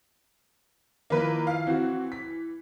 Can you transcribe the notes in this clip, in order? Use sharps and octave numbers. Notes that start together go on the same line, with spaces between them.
D#3 F3 A#3 E4 B4
F5
E3 C4 F#4
B6